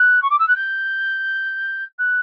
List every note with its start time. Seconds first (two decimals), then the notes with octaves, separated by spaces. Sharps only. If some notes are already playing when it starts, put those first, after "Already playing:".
Already playing: F#6
0.22 C#6
0.30 D6
0.39 E6
0.48 F#6
0.56 G6
1.99 F#6